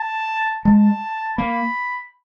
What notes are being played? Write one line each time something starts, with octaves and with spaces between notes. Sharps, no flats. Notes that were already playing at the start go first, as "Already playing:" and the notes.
Already playing: A5
G#3 A5
A#3 B5